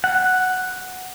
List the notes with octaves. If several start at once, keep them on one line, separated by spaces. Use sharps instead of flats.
F#5